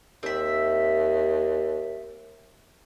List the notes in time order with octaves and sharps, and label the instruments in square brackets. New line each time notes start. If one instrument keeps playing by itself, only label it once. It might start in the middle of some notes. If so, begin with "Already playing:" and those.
[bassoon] D#2 [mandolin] C4 E5